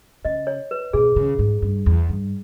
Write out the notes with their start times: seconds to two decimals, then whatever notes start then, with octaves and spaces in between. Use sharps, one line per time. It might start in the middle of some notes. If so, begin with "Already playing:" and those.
0.25 C#3 D#5
0.47 C#5
0.71 B4
0.93 B2 G#4
1.16 C#3
1.39 G#2
1.62 G2
1.86 E2
2.09 G2